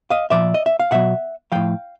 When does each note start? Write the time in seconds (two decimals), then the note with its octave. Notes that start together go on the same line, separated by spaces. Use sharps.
0.10 D#5 F5
0.30 A#2 F3 D5 E5
0.54 D#5
0.66 E5
0.80 F5
0.91 B2 F#3 E5 F#5
1.52 A2 F3 F5 G5